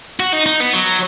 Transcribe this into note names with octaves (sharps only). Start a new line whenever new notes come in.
F#4
D#4
D#4
B3
F#3